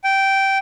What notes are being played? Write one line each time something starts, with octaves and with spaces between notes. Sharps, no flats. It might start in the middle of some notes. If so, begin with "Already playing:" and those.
G5